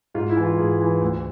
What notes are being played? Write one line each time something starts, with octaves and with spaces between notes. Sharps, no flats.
G#2 F4
E4
E3
F4
G#2 G#4
E3
D2